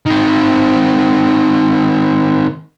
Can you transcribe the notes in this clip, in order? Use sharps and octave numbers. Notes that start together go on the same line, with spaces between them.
D#3 C4